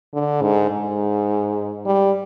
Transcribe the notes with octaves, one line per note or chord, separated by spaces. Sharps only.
D3
G#2
G#2
G3